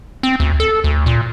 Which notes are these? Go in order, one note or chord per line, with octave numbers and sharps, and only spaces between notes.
C4
D2
A4
D2
A#2